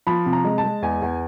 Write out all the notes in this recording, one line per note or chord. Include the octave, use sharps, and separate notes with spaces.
F3 B5
C3
A#5
G#3
A5
G#3
E2 G#5
E2